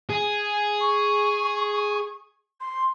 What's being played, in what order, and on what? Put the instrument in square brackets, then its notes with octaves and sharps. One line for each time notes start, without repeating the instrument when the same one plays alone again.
[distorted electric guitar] G#4
[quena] C#6
C6